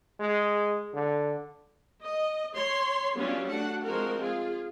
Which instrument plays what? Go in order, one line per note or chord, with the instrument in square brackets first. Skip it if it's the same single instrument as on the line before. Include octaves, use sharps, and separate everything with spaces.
[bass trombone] G#3
D3
[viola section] D#5
C#5 C6
F#3 G3 B3 C#4 D4 F4
A3 D4 F#4 F#5
F3 G#3 C4 F#4 A#4
F4 G#4